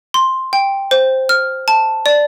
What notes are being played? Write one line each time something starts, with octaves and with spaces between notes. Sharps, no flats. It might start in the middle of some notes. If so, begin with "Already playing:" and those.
C6
G5
C5
F6
A5
D5